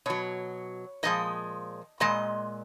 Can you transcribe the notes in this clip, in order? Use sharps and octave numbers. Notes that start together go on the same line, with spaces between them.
B2 F#3 C#5
A#2 F3 G#3 D#5
A#2 G#3 D#5